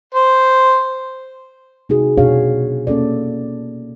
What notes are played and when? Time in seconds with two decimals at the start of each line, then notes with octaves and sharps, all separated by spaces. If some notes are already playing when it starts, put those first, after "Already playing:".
0.14 C5
1.89 C3 D#4 F#4 G#4
2.17 B2 D4 F#4 G#4 C#5 F5
2.87 A#3 C#4 A4 D5